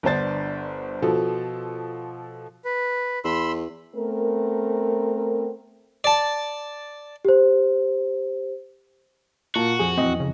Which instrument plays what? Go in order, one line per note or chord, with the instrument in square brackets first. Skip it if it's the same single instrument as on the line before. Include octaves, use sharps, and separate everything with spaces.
[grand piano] G1 B3 D4 C5 A6
B2 F3 A4
[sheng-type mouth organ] B4
[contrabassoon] E2 [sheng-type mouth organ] B5 C6 E6
[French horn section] A3 B3 C4 A#4
[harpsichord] D5 A5
[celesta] G4 C5
[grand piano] A#2 A#3 A5 [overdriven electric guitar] F#4
[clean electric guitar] F2 G#5 [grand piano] G#4
[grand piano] E2 D#5 [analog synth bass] C4
[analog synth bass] C#3